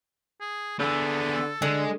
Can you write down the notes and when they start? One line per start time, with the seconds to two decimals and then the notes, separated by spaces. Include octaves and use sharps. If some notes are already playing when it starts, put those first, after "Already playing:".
0.41 G#4
0.80 D3 B3 G#4 A4
1.62 D3 G#3